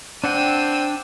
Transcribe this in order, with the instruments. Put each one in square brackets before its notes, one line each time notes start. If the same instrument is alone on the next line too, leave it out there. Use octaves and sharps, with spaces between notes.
[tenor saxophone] C4 [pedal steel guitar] D4 F#5 G5 [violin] E6 D#7